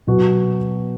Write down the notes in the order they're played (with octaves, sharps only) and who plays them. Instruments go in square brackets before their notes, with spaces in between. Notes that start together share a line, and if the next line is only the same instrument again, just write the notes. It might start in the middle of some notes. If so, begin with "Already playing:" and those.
[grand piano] B2 F#3 B3 F#4